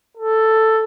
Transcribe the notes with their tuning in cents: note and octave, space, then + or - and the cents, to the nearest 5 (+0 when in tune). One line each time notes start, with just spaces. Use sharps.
A4 +5